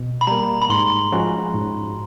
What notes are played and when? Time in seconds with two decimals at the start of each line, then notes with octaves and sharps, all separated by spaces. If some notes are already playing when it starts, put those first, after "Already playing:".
Already playing: B2
0.21 B5
0.27 G3 A#3 A#5
0.62 B5
0.69 G#2 C6
1.12 F3 G#3 C#4 F#4
1.54 G#2